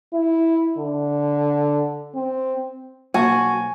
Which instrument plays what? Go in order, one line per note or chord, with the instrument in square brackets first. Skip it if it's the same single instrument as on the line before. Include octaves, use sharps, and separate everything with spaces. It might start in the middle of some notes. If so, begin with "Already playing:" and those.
[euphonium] E4
D3
C4
[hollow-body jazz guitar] B1 A#3 A5 [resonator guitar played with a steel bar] F#4 [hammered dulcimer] G#5